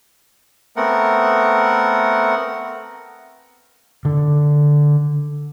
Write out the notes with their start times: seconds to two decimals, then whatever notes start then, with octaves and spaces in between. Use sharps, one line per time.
0.77 A3 B3 C4 A#4 F#5
4.05 D3